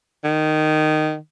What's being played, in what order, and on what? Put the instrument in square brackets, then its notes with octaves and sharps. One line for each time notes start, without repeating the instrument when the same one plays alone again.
[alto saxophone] D#3